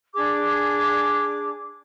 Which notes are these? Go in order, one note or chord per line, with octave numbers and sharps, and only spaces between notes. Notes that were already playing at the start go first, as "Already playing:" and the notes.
D4 G#4 D6